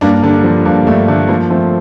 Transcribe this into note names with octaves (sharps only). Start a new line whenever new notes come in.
G2 A#3 D4
D3 A#3 D4
F3
G2 A#3
G2 A3
D3 A3
F3 A#3
F3 A3 C4